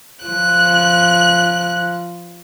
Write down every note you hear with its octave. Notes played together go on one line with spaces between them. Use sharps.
F3 F#6